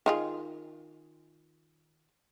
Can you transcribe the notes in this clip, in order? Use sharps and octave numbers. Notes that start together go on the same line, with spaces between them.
D#3 F4 G#4